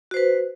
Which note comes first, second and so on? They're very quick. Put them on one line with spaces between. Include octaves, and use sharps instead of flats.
F#4 C5 B4